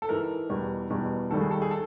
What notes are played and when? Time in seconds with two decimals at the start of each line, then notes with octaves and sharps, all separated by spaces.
0.02 A4
0.09 G#2 E3 G#3 A#4
0.49 E2 B2 G3
0.90 E2 B2 G3
1.31 D#2 D#3 G3 A4
1.40 G#4
1.51 A4
1.62 G#4
1.71 A4